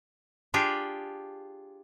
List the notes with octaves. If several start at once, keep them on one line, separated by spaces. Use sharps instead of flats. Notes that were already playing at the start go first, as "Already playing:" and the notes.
D4 F4 G4 G#4 G5